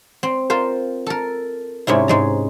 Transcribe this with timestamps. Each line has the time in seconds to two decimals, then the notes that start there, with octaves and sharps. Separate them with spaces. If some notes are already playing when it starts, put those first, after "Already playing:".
0.23 C4
0.50 F4 A#4 C5
1.06 A4 A#4
1.87 G#2 C3 C#4 E4
2.08 G#2 G#3 A#5